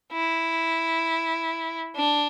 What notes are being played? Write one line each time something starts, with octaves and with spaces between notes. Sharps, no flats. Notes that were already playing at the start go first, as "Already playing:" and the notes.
E4
D4